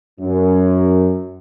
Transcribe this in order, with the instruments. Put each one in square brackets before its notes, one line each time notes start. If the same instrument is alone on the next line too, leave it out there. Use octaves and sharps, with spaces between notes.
[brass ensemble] F#2